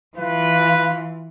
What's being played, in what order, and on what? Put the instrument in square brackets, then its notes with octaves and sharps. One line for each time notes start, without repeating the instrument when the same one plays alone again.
[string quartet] E3 F4 [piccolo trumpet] B4